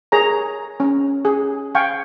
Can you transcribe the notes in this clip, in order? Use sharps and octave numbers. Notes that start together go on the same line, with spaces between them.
G#4 A#4 C#5 A#5
C#4
G#4
F5 G5 G#5 C#6